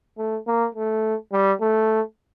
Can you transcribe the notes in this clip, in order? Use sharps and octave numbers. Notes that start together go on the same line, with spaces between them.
A3
A#3
A3
G3
A3